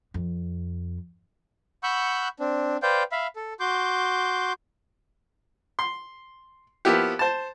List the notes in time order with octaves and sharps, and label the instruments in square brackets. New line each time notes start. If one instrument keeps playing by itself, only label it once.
[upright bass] F2
[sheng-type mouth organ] F#5 B5 C#6 E6 F#6 G6
C4 D4
B4 C5 D5 F5 G5 G6
E5 F5 B5
A4
F#4 C6 D6 G6
[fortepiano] C6
F3 A#3 B3 E4 G4
C5 A5